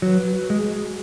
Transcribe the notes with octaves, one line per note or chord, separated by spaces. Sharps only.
F#3 B4
F#4
G#3 G#4